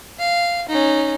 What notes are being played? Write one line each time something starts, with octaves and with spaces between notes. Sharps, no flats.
F5
C#4 D#4